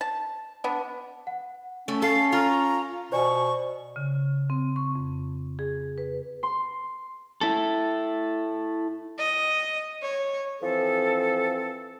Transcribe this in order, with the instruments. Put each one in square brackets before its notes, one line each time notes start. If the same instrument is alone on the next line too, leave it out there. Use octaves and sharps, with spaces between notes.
[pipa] A5
B3 D4
[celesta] F#5
[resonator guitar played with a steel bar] A3 [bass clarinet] C#4
[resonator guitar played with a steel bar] A4 [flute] F5
[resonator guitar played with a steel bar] F4 [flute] A#5 [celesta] C#6 F6
[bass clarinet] B2 [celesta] C5 D5 G#5 [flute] C#6
[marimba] C#3
C4
C#6
F2
G#4
B4
[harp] C6
[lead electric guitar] E4 A4
[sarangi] D#5
C#5
[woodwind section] E3 F3 C4 A4